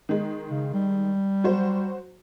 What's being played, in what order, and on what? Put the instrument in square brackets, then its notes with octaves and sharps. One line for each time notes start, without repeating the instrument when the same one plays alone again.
[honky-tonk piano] D#3 G#3
[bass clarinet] C#3
G3
[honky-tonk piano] F#3 F#4 C5